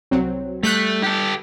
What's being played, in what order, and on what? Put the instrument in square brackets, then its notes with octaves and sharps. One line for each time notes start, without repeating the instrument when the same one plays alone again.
[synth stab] C2 F#3 C4
[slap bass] G3 [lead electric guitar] A3 [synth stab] F#6 G6 B6
[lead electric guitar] G4 A4